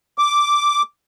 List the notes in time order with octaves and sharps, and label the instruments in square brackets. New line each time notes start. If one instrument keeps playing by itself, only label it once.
[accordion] D6